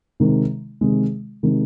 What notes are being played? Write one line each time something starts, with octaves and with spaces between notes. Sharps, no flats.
C3 D#3 G#3
C3 D#3 G#3
C3 D#3 G#3